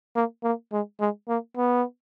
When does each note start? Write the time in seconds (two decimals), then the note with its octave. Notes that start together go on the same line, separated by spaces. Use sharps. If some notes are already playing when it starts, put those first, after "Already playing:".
0.15 A#3
0.44 A#3
0.72 G#3
1.00 G#3
1.28 A#3
1.57 B3